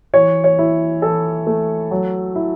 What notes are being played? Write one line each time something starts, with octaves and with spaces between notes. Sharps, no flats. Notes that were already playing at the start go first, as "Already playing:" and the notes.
E3 C#5
C#5
E4
E3 A4
A3
F#3
E4